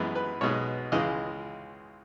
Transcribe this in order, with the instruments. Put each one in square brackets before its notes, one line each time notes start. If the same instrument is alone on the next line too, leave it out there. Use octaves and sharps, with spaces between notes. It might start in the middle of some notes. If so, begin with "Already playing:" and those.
Already playing: [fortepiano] F#2 E3 G#3 B3
B4
B1 B2 G#3 B3 C#5
C#2 C#3 E3 G#3 D#5